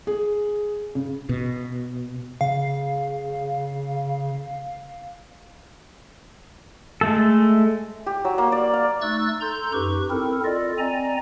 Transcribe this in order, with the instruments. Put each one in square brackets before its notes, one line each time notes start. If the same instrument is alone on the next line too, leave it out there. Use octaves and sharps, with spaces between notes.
[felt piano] G#4
C#3
[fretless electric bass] B2
[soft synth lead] C#3 [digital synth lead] F5
[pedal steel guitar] G#3 A3 A4
[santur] G4
F#3
A#3
D5
F5
[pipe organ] A3 D#4 C#6 E6 F#6 A6
A4 A#5 C6 G6
F#2 D#4 G4 B4 C#6
C4 E4 A4 A#4
F4 A4 D5 D#5
C4 D5 D#5 G#5 A#5